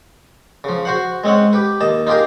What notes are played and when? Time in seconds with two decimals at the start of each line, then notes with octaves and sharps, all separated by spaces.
0.64 C#3 F3
0.85 F#4 C5 F#5
1.24 G#3 C4 C#4 F#5
1.53 G4 B4
1.81 D#2 D#5 A5
2.07 D#4 F4 G4 G#4 A#4